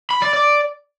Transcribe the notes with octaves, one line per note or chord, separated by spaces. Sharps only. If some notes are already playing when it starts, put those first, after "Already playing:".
B5
D5
D5